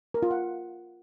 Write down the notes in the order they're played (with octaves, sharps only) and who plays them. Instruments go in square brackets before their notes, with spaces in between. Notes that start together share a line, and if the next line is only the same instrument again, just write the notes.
[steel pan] A#4
F4
F#5